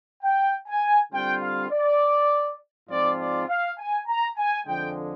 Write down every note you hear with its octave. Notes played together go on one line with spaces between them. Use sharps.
G5
G#5
D3 G3 C4 F4 G5
F5
D5
G#2 F3 C4 F4 D5
D5
F5
G#5
A#5
G#5
F2 D3 F3 G#3 G5